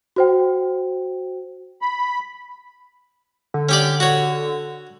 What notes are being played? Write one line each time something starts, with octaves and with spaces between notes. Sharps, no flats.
F#4 C5 G5
B5
D3
C#4 G4 D5
F#4 C#5